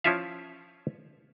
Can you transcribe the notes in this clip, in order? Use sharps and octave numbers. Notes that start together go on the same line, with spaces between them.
F3 C#4 E4 F4 E5 F5